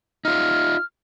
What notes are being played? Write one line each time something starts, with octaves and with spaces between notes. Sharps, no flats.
D#4 F4 F6